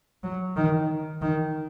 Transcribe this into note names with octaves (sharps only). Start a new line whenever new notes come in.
F#3
D#3
D#3